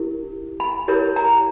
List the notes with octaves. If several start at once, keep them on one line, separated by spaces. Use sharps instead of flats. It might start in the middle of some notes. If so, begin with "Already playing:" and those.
Already playing: E4 G4 A#4
B5
E4 G4 A#4 C#5
A#5